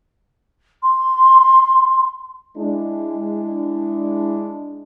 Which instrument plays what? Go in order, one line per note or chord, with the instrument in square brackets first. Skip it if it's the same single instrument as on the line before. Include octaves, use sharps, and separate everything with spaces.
[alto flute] C6
[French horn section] G#3 D4 E4